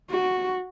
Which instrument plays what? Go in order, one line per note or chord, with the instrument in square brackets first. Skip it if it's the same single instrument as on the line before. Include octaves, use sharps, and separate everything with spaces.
[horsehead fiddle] F#4